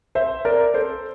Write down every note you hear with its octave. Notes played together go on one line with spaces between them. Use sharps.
C5 E5
A#4 D5
A4 C5